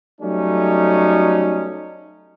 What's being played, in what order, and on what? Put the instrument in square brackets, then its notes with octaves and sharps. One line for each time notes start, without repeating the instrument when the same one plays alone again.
[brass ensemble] F#3 G3 A3 C#4 D#4